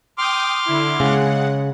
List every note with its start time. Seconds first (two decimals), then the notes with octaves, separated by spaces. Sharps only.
0.18 G5 C6 D6 D#6 F6
0.65 D3 E4
1.00 C#3 G#3 F#5